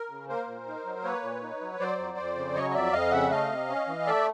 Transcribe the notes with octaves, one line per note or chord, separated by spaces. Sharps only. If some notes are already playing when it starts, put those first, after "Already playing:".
Already playing: A#4
C#3
A#3 A#4 C5
A#2
D#4
F#3
A#3 B4 C#5
A#2
D#4
F#3
F#3 C5 D5
F2
F2
C#3
F#3 C#5 D#5
D#5
F2 D5 E5
F2 D#5 F5
C#3 E5 F#5
A3 D#5 F5
C3
C#4
E3
A3 D5 E5